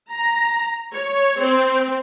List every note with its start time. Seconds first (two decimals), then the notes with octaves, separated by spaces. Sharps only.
0.12 A#5
0.93 C#5
1.41 C4